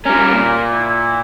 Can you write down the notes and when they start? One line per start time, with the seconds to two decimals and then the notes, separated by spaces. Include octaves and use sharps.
0.05 G3 C#4 A#4
0.33 A#2
0.72 E4